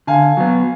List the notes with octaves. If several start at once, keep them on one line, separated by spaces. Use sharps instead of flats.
D3 F5 G#5
F#3 B3